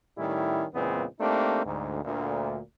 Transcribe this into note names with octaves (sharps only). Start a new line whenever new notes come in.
A2 D#3 G3 C#4 E4
E2 A#2 C#3 G#3 B3 C4
A3 A#3 C4 D4 D#4 G4
D2 G#2
D2 A#2